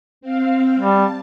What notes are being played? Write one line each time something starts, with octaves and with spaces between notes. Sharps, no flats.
C4 F5
G3 A5